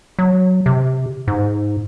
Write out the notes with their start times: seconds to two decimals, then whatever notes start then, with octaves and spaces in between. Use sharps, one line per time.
0.19 F#3
0.66 C3
1.28 G#2